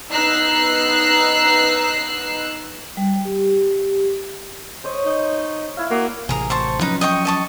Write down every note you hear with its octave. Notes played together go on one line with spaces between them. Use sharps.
B3 D#4 E6 F#6 C7
G3
G4
C5 C#5 D#5
D#4
E4 F5
A#3 F#4 A#5 D#6
A1 C3 G#4 A#4
C5 A5 C#6
F3 F#3 C#4 D#4 B4
D#5 G5 C#6
D#5 A5 C#6